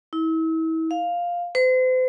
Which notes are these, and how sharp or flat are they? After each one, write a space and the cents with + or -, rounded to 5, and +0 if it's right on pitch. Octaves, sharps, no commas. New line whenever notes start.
E4 -35
F5 +5
C5 -40